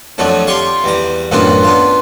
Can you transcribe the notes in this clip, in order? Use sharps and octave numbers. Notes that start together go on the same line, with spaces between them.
F2 F3 F#3 A3 D4
F4 G4 F5 C6 C#6
E2 G3 A#5
F#2 A2 E3 B3 D4 F4
B3 D4 F4